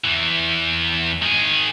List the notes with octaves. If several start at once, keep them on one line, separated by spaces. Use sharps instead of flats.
E2 E3
D#3 G#4